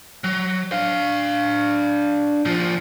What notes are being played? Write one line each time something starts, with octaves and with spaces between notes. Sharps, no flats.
F#3
D4 F5
A#2 F3